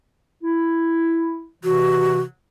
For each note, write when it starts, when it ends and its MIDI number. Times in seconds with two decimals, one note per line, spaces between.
0.44 1.46 64
1.64 2.23 48
1.64 2.23 52
1.64 2.19 66